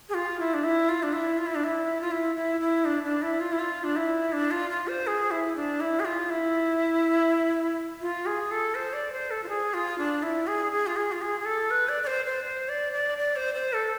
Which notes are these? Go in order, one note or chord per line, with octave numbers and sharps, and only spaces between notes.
G#4
F4
E4
D4
E4
F4
D4
E4
F4
E4
D4
E4
F4
E4
E4
E4
D4
D4
E4
F4
E4
F4
D4
E4
D4
F4
F4
C5
G#4
E4
D4
E4
G#4
F4
E4
F4
G#4
A4
C5
D5
C5
A4
F4
G#4
F4
D4
E4
G#4
G#4
F4
G#4
F4
G#4
G#4
A4
B4
D5
D5
C5
C5
C5
D5
D5
D5
C5
C5
A4